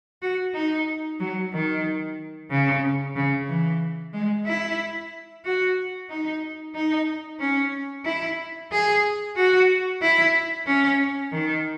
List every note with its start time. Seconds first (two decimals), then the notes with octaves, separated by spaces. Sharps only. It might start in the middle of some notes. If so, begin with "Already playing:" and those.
0.22 F#4
0.54 D#4
1.20 F#3
1.53 D#3
2.50 C#3
3.16 C#3
3.48 E3
4.13 G#3
4.46 E4
5.45 F#4
6.09 D#4
6.75 D#4
7.40 C#4
8.05 E4
8.72 G#4
9.36 F#4
10.02 E4
10.67 C#4
11.32 D#3